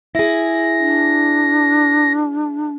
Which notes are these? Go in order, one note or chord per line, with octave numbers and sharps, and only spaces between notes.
E4 G#4 A#6
D4